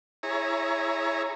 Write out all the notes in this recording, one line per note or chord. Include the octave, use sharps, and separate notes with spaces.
E4 G#4 C#5 A#5